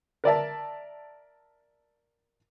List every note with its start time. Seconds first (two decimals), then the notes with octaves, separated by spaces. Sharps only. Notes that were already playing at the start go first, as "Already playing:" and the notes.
0.24 A#4 D5 E5 A5